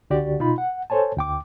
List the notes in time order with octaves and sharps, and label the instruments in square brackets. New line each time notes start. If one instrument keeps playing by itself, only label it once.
[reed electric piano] C#2 D3 F#4 G4 D5
B2 D#4 F4 B5
F#5
A4 C5 C#5 G#5 A5
D2 G5 D6